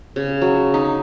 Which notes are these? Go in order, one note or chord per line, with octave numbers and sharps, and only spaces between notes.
C#3
F#3
D#4